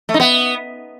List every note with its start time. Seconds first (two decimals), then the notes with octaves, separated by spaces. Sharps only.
0.09 A3
0.14 D#4
0.20 B3